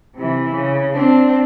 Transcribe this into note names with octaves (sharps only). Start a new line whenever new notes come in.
C3 E3
C#3
C4 D4